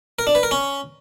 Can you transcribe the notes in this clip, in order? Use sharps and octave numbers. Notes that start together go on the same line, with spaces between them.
A#4
D4
B4
A#4
C#4